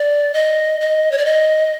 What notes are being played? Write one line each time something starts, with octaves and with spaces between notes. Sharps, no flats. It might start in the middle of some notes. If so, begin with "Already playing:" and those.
Already playing: D5
D#5
D#5
C#5
D5
D#5